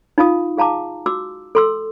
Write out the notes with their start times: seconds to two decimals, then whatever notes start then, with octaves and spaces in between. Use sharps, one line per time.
0.18 D#4 F4 F5 A5 D#6
0.57 G#4 F5 A5 A#5 D6
1.06 F#4 D6 E6
1.55 A4 C6 E6